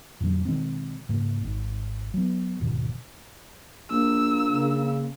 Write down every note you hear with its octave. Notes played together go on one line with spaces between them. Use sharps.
F2 A#2 D3 F#3
B2 D#3 G#3 C4
G#2 C#3 A#3
G#1 G#2
F#3 B3
D#1 G#2 B2 D#3
A#1 A#3 E6
C#3